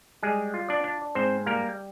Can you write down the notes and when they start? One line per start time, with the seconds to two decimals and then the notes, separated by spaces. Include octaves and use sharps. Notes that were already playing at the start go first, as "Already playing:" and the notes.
0.23 G3 G#3 G#4
0.54 F4
0.69 D4 D5
0.84 D4
1.15 G#2 C4 C5
1.46 G3 A#3 A#4